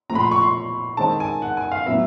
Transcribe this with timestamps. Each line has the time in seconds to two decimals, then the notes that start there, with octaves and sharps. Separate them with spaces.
0.10 A#2 F3 A3 A#5
0.15 B5
0.20 C6
0.31 C#6
0.43 C6
0.97 D#3 G#3 C4 A5
1.20 G#5
1.42 F#5
1.57 G#5
1.72 F5
1.86 A2 F#3 B3 E5